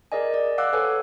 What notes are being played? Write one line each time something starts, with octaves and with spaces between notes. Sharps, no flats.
G#4 A#4 D5 D#5 G#5
D5
F5 F#5 D6 E6 F#6
A4 B4 C#5 F#5 G#5